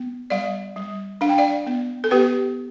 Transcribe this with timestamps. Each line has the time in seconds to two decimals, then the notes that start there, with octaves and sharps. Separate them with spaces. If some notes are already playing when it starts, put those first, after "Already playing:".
Already playing: B3
0.30 G3 D5 F5
0.76 G3
1.21 D4 F5
1.29 G5
1.38 D5 F5
1.67 B3
2.04 A4
2.11 B3 G4 B4